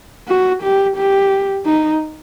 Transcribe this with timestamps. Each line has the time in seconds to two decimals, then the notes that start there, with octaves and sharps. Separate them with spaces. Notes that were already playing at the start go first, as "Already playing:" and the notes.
0.28 F#4
0.62 G4
0.96 G4
1.66 D#4